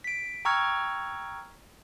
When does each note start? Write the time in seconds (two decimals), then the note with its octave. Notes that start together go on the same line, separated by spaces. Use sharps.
0.04 B6 D7
0.45 G5 A#5 C#6 E6 F6 G#6